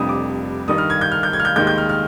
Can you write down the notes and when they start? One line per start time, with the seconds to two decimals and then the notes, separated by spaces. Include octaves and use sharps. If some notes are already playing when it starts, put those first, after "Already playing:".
Already playing: F1 F2 C3 G3 D4 D#6
0.09 D6
0.68 G2 D#3 G3 D#6
0.78 F6
0.90 G#6
1.01 G6
1.12 F6
1.23 G6
1.33 G#6
1.40 F6
1.45 G6
1.56 D#2 D#3 G#3 G6
1.67 G6
1.78 F6
1.89 F6